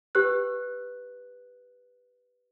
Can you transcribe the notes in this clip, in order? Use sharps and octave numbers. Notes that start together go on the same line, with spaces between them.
G4 B4 F#6